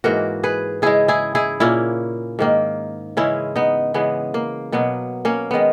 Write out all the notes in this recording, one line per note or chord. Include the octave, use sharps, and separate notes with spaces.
G#2 E3 A#3 F#4 A#4
G#4 B4
C#3 G#3 E4 G#4
E4 G#4
E4 G#4
A#2 A#3 C#4 E4
G#2 D#3 A#3
C#3 E3 G#3 C#4 E4
B3 D#4
C#3 E3 G#3 B3
A#3
B2 F#3 A#3 B3
A#3 C#4
D#3 G#3 B3